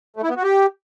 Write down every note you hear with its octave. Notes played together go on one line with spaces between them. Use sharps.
A3
E4
B3
F#4
G4